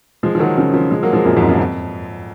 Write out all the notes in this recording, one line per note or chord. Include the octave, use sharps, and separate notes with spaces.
F3 G#3
F3
D#3 F#3
C#3 F3
C#3 F3
F3 G#3
F#3 A#3
F3 G#3
F#2 A#2
F2 G#2
F#2
F2